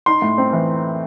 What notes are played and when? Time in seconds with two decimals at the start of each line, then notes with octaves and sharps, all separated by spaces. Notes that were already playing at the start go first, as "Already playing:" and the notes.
0.06 D#4 C6
0.22 A2
0.38 C4
0.53 E3